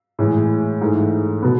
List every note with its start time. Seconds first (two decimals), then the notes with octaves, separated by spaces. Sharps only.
0.19 A2 E3 G#3
0.81 G#2 E3 A3
1.42 B2 B3